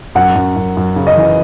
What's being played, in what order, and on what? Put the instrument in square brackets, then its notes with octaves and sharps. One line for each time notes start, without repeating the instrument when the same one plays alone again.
[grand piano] F#2 [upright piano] F#5
[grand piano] F#2
F#2
F#2
C#3
[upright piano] D#5
[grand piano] E3